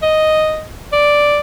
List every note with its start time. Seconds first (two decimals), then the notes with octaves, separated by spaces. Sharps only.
0.02 D#5
0.93 D5